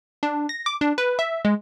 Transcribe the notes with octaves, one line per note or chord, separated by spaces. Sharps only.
D4
A#6
D6
D4
B4
E5
G#3